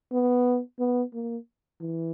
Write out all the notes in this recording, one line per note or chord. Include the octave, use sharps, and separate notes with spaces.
B3
B3
A#3
E3